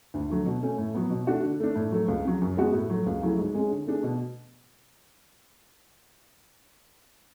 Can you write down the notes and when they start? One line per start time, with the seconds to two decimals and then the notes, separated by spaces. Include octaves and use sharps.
0.14 D2
0.30 D3 F#3 A3
0.46 B2
0.63 A3 C#4
0.78 A2
0.94 F#3 B3
1.10 B2
1.27 A3 D4 F#4
1.44 D3
1.60 A3 D4
1.76 A2
1.92 F#3 A3
2.08 C#2
2.25 C#3 F#3
2.41 F#2
2.57 C#3 G#3 B3 F#4
2.73 A2
2.90 F#3 A3
3.06 C#2
3.22 C#3 F#3 A3 E4
3.39 G#2
3.55 G#3 C#4
3.71 D3
3.86 A3 D4 G#4
4.03 B2